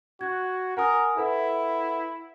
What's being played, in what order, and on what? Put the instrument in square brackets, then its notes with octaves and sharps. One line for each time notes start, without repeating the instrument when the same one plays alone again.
[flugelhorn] F#4 [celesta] F#6 G#6
[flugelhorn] A#4 [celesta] F#5 G#5 D#6
[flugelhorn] E4 [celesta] A4 B4 F#5